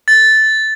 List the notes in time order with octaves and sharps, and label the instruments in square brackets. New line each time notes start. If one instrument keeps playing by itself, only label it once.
[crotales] A6